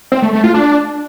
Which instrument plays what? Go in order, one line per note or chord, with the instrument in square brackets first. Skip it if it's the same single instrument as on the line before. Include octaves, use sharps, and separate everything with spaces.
[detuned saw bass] C4
A3
A3
F4
D4